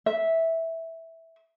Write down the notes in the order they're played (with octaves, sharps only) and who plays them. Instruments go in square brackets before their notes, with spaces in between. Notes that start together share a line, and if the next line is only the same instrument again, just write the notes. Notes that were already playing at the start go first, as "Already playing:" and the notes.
[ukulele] E5